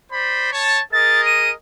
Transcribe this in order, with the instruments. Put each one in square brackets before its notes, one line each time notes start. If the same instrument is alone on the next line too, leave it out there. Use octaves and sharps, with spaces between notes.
[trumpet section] C5 D5 B5
C#5 A5
[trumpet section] G#4 A#4 D#5 [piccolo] A6
[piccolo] D#7